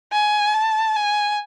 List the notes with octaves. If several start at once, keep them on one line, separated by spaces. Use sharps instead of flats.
G#5
A5
G#5